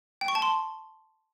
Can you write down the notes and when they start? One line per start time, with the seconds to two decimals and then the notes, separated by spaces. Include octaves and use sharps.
0.21 G5
0.28 C#6
0.35 A5
0.42 C6